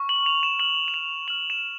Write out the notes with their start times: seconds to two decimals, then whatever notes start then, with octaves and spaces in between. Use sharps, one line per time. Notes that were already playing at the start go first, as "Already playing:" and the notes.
Already playing: C#6 F6
0.09 F#7
0.26 F7
0.43 E7
0.60 C#6 F6 F#7
0.88 E7
0.94 F7
1.27 C#6 F6 F#7
1.50 E7